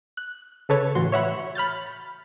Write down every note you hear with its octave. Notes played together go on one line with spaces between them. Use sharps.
F#6
C#3 A4 B4 C#5 A6
A2 E3 F#4 C6
C#5 E5 F#5 B5
B5 F6 G6 A6